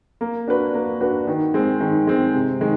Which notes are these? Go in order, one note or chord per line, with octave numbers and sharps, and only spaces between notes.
A#3
D4 F#4 B4
A#3
D4 F#4 B4
D#3
G#3 C4
D#3
G#3 C4
C3
D#3 G#3